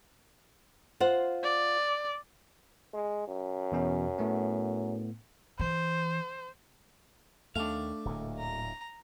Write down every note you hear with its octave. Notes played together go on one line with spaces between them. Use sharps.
F4 C5 F#5
D5
G#3
F#2
E2 B2 C#4
A2 A3 B3
E3 C5
D#2 A3 D4 F5
D1 D2 A#2
A#5